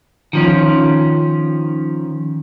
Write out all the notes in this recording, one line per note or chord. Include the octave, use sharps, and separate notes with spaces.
D#3 F3 C#4